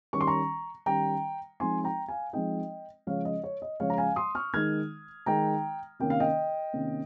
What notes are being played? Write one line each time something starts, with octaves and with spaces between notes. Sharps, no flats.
D#3 G3 C#4 C#6
C6
A#5 C#6
D#3 G3 C#4 G5 A#5
F3 G#3 C4 D#4 G#5 C6
G5 A#5
F5 G#5
F3 G#3 C4 D#4 D#5 G5
C#3 F3 G#3 C#5 F5
D#5
C#5
D#5
C#3 F3 G#3 C#5 F5
A#5
F5 G#5
C6 D#6
C#6 F6
D#3 G#3 D#4 F6 G#6
D#3 G#3 D#4 G5 A#5
C3 D#3 A#3 C#4 G5
F5
D#5 G5
C3 D#3 A#3 C#4